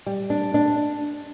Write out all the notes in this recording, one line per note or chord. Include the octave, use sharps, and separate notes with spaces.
G3
D4
D4